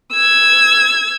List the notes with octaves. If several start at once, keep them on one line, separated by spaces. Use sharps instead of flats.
E6 G#6